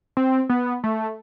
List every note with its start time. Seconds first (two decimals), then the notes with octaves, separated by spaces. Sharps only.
0.17 C4
0.49 B3
0.84 A3